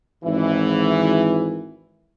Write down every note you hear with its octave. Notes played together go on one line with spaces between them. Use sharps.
G#1 E3